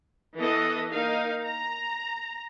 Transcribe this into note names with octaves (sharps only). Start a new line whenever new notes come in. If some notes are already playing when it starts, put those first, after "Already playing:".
E3 B3 A4 B4 D#5
A#3 D#4 A#4 F5
A#5